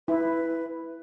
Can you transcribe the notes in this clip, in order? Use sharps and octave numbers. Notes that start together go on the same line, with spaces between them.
E4 B4